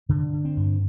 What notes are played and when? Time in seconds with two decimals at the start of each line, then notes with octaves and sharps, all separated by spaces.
0.09 G2 D3
0.33 D3
0.45 C4
0.57 G2